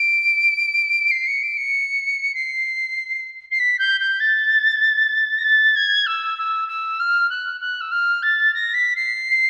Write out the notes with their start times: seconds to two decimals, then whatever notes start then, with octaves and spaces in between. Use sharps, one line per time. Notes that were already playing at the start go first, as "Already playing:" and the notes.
Already playing: D7
1.10 C7
1.27 C#7
1.42 D7
1.57 C#7
2.34 C7
3.51 C7
3.59 B6
3.79 G6
4.00 G6
4.20 A6
5.38 A#6
5.44 A6
5.76 G#6
6.06 E6
6.37 E6
6.68 E6
6.99 F6
7.29 F#6
7.60 F#6
7.81 E6
7.91 F6
8.22 A6
8.54 A#6
8.74 B6
8.95 C7